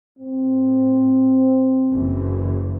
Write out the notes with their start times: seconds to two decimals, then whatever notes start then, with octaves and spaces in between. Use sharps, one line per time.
0.19 A2 C4
1.90 F#1 F#2 E3